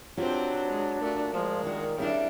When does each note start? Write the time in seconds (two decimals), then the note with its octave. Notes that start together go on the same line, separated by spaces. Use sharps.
0.17 F#3 C4 D4 F4 G4 B4 C5
0.70 G#3
1.01 A#2 A3 F#4
1.33 F3 G#3
1.63 D#3 D4 F#4
1.98 C#3 G3 C4 D4 E4 A#4